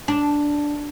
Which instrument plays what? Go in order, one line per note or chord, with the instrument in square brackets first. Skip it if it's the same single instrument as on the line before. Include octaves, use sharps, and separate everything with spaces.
[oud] D4